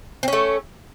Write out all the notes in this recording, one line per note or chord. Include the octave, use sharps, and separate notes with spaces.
A3 C4 C#4